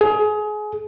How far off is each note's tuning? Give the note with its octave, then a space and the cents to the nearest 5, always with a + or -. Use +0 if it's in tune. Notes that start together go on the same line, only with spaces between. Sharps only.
G#4 +25